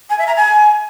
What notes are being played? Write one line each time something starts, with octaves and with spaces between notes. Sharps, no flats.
G#5
E5
A#5
G#5